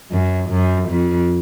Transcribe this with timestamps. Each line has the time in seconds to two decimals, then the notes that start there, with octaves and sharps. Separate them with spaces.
0.11 F#2
0.50 F#2
0.89 F2